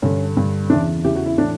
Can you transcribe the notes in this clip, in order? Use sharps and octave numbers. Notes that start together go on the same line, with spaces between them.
G2 D3 C#4
G2 D3
E2 C#3 E3 D4
E2 C#3 E3 G4
F#4
E4
A2 E3 D4